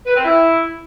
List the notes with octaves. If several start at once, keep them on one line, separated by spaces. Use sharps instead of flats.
B4
C4
E4